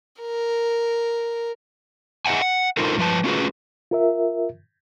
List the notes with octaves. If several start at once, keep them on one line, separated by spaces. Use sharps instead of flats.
A#4
G#4 D#5 E5 F#5 G#5
F#5
D#4 F4 A4 A#4 C5
G2 F3 B4 A5
A3 C#4 F4 F#4 G#4 B4
F4 A#4 E5